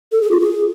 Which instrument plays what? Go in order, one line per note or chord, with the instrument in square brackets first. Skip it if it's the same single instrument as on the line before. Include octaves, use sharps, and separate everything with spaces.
[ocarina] A4
G#4
F4
G#4